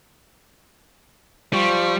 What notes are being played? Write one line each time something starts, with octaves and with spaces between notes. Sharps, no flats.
F3 G3 C#6